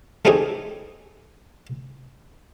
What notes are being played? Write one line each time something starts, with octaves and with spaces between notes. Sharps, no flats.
A3 C4 C#4 D#4 G4 G#4